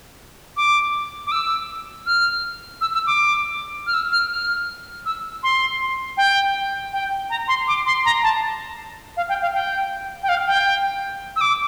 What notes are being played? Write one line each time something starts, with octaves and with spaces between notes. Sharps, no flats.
D6
D6
E6
F6
E6
E6
D6
F6
E6
F6
F6
E6
C6
G5
G5
A#5
C6
D6
C6
A#5
A5
F5
G5
F5
G5
G5
F5
G5
E6
D6